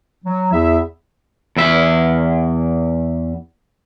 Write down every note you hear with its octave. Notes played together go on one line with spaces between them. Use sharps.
F#3
E2 E4 G#4 E5
E2 E5